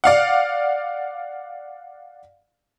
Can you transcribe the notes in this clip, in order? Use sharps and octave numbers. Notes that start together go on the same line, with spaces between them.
D5 F5 F#5